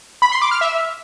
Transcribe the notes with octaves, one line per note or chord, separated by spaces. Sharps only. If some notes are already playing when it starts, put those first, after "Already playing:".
B5
C6
D6
F6
E5